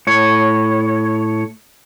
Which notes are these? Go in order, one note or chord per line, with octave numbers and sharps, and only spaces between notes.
A2 C#5